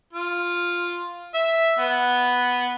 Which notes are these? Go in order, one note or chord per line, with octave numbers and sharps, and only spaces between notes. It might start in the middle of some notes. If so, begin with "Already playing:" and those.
F4
E5
B3